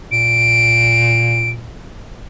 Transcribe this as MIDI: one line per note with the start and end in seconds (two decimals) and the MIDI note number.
0.12 1.72 46
0.12 1.50 98